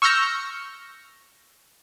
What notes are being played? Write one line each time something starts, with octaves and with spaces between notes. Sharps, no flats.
C#6 E6 F6 G6 A#6 C#7